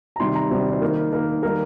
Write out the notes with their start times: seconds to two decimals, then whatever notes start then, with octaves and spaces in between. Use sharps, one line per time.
0.16 A#5
0.20 C3 D#3 G3 C6
0.35 A#5
0.51 C3 D#3 G3 C5
0.72 C5
0.82 D#3 A#3 A#4
1.13 D#3 A#3 A#4
1.43 D#3 G3 A#3 A#4